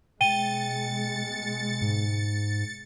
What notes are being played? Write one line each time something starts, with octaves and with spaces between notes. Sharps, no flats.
B2 G#3 G5 A6 C#7 D#7 G7
G#2